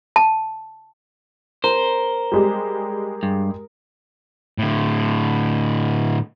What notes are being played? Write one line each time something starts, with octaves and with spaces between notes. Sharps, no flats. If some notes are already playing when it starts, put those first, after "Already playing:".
A5
A#4 C5
G3 G#3 G4
G2
A2 D3